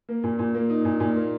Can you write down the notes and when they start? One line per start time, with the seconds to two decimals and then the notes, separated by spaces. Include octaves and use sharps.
0.09 A#3
0.24 A#2
0.39 A#2
0.54 A#3
0.70 D#4
0.85 A#2
1.00 A#2
1.16 A#3